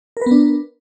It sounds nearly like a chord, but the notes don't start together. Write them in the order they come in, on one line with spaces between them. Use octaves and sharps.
A#4 B4 B3 D4